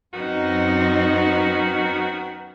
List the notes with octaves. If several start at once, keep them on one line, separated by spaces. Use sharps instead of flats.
F#2 D#3 B3 C4 D#4 F#4